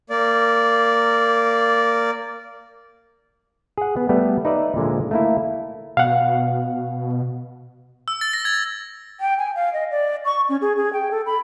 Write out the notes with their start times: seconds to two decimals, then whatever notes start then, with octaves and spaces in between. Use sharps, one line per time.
0.10 A#3 D5
3.78 G#4 F#5
3.97 B3
4.09 G3 A3 B3
4.45 D#4 B4 D5 E5
4.76 A#2 D3 F3 G#3
5.11 A3 A#3 E4
5.97 B2 F5 F#5
8.08 E6
8.21 A6
8.33 A#6
8.45 G#6
9.20 G5
9.38 G#5
9.55 F5
9.73 D#5
9.91 D5
10.25 C#6
10.49 C#4
10.62 G#4
10.77 G#4
10.93 G5
11.11 A4
11.26 B5